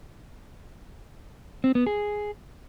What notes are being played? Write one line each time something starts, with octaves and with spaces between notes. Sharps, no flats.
C4
B3
G#4